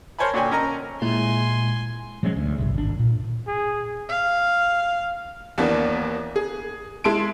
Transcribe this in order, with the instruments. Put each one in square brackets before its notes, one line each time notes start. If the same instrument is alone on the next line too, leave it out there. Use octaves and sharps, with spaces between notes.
[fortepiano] A#4 C5 C#5 G#5 A5 B5
A#2 D3 F#4 C#5 G5 G#5
C#4 A#4 D#5 A#5
[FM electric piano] A#2 G#3 E4 [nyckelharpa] G#5 C6
[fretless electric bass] F3 F#3 G#3 C#4
D2
G1 C2
G#1 D4
A#2
[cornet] G#4
[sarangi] F5
[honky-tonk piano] D#2 E3 A#3 B3 D4
G#4
G#3 E4 A5 C6 D7